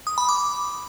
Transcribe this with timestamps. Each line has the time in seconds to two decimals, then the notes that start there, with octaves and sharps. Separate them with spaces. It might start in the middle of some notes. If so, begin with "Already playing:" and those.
0.07 D#6
0.18 B5
0.29 D6